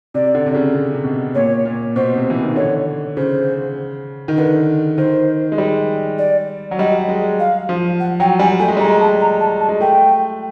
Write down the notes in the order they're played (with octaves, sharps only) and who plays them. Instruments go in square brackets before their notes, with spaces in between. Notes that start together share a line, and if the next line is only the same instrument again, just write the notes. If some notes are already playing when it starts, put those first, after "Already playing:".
[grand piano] C3 [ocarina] D5
[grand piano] D3
C3
C#3
C3
C3
B2
[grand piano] A#2 [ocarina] C#5
[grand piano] A#2
[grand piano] B2 [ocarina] C5
[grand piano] C3
E3
D#3
[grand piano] D3 [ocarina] C#5
[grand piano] C#3 [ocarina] C5
[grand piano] D#3
[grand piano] D3 [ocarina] B4
[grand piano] D#3 [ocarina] C5
[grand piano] G#3
G3
[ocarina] D5
[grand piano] F#3
[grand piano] G3 [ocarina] D#5
[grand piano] G#3
[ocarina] F5
[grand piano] F3
[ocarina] F#5
[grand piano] F#3 [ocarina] G5
[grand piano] G3 [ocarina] G#5
[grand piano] A3 [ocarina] G#5
[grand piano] G#3
G3
[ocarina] A#5
[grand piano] G#3
[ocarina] A#5
A5
A#5
A5
A5
[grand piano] G#3
[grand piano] A3 [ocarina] G5